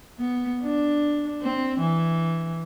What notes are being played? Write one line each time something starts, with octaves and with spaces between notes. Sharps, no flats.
B3
D4
C4
E3